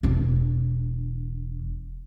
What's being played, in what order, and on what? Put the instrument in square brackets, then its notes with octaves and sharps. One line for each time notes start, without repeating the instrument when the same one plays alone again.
[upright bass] E1 D4